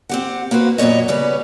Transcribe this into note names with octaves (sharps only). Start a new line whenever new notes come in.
C4 G4 F#5
A#3 B3 F#4 B4 C5
F#2 A#2 B3 C#5 D#5
C#3 G3 B3 C#5